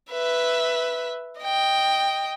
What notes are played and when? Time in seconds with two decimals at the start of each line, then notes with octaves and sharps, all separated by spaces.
0.11 B4 E5
1.41 D#5 G5